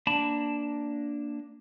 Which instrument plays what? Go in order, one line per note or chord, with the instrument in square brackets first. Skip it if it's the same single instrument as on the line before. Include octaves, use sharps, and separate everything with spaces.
[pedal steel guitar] A#3 D4 A5 B5